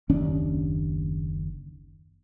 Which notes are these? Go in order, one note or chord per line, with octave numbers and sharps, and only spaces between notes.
F#1 D#2 C#4 D4